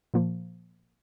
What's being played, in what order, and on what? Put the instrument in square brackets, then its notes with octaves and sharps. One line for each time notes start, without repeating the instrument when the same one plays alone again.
[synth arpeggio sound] A#2 F3 A#3